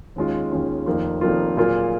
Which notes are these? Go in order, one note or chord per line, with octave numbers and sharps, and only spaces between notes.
D#2 D#3 G#3 C#4 F4
D#2 D#3 G#3 C#4 F4
F1 F2 D#3 A#3 F4
F1 F2 D#3 A#3 F4
A#2 F#3 A#3 F4 G#4